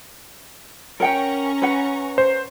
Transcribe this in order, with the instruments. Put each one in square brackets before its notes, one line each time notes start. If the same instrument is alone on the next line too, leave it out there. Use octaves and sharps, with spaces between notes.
[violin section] C#4 A#5 C#6 [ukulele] A#4 F#5 G5
[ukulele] B4 F#5
[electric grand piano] C5